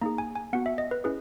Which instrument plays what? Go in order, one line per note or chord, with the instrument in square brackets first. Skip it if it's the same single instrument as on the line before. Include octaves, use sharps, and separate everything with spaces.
[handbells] A#3 D#4 G#4 A#5
G#5
G#5
B3 F#4 F#5
E5
D#5
B4
C#4 E4 G#4 B4